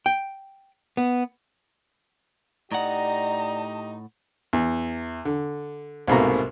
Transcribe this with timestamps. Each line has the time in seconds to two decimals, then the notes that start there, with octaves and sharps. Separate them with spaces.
0.06 G5
0.97 B3
2.72 A2 D#4 G4 D5 D#5 F#5 A#5
4.53 E2
5.25 D3
6.08 C2 G#2 B2 A3 A#3 A#5